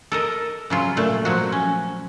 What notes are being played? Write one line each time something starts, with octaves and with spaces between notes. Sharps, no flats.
A4 A#4 D#5
C#3 F#3 F4
A#2 A3
F3 F#3 F#4
C#4